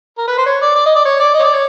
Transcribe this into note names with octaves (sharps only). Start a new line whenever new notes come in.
A#4
B4
C5
C#5
D5
D5
D#5
D5
C#5
D5
C#5 D#5
D5
C#5